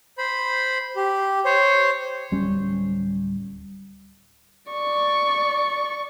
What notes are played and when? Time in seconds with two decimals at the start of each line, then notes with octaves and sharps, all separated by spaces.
0.18 C5 B5
0.96 G4
1.45 C5 C#5
2.31 D1 G3 C#4
4.72 D5 C#6